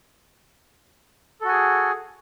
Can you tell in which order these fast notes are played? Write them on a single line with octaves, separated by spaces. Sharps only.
A4 F#4 G#5 G#4